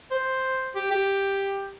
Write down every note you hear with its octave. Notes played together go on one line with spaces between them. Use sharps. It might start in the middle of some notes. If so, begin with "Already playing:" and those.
C5
G4
G4